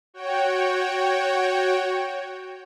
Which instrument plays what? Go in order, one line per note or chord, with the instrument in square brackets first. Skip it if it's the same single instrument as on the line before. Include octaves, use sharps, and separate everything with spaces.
[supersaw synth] F#4 C#5 G5